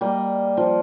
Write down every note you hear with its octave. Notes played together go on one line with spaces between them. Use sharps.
G3 A#3 D#5
F3